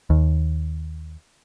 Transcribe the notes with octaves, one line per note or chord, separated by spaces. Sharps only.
D#2